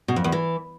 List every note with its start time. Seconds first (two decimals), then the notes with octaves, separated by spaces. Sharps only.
0.08 B2
0.16 F2
0.24 E2
0.32 E3